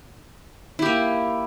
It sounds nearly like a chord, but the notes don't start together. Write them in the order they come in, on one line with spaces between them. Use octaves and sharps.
E4 G4 A#3